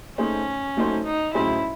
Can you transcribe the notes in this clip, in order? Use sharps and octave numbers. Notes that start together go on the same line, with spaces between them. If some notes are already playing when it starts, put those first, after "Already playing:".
A3 C#4 D#4 G#4 C5
F#3 A3 D#4 F#4 C5
D#4
A2 F#3 C#4 E4 G#4 C5